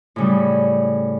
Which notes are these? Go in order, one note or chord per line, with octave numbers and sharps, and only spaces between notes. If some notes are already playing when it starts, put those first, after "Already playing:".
A2 C#3 G3